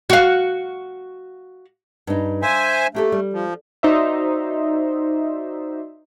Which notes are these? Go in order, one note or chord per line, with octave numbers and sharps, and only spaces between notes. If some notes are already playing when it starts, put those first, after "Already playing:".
F#4 F5
G2 D#4
C5 E5 F5 G#5
A3 A#3 G4 A4
G3
F3
D#4 F#4 C5 D5 E5